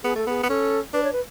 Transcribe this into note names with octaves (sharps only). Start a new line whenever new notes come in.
B3 G#4
A3 A4
B3 G#4
B3
C#4 A4
D4 B4
C#5
B4